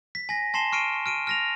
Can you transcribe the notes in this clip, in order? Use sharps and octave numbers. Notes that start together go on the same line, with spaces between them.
B6
G#5 A#6
G#5 A5 C6 C7 E7 G7
C#6 F6 C7 D7 D#7
F6 D7 D#7
F6 A#6 F7